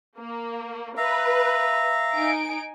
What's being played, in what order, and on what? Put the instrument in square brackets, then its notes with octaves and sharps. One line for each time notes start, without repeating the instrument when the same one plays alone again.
[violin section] A#3
[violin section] B4 [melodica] E5 F5 A#5
[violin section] D#4 G#5 D7